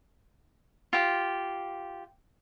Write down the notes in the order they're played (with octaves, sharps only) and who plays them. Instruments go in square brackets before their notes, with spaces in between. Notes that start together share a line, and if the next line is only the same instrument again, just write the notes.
[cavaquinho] F4 G4